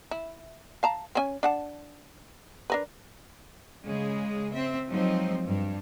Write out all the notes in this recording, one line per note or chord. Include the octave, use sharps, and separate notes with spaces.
E4
F5 A5 A#5
C4 C#4 G#5
D4 F#5 A5
D4 A#4 B4
C#3 G#3 G#4
C4 E5
F3 F#3 G#3 C4 D#4
G2 D4